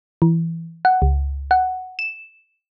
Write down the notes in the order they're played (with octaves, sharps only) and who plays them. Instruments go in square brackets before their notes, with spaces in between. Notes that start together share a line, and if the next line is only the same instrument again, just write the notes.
[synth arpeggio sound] E3
F#5
C#2
F#5
E7